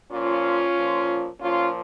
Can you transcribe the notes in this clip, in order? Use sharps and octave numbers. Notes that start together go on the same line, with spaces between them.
A#2 F3 C#4 F4
A#2 F3
A#2 F3 C#4 F4